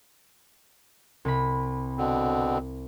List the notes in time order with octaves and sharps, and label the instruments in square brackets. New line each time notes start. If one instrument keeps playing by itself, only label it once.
[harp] C2 B5
[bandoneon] B2 D3 C4